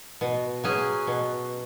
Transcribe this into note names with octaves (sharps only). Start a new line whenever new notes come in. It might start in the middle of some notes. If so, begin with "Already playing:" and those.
B2
F#3 C#4 G#4
B2